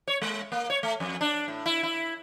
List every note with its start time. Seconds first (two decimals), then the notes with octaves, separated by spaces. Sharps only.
0.08 C#5
0.22 G#3
0.52 A#3
0.70 C#5
0.83 A3
1.00 F2
1.21 D4
1.48 A2
1.66 E4
1.83 E4